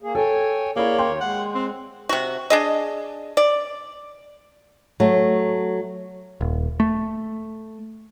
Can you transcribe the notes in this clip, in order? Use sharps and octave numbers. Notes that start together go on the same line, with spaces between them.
A#3 G#4
A4 C#5 G5 G#5
A#3 E4 G#4 C#5 D5
D#2 C#5 G5 C6
G#3 F#5
C4
C3 F#4
D4 G#4 D#5
D5
F#3 A3
D#1
A3